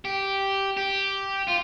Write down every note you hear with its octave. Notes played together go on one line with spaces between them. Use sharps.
G4
G4
F4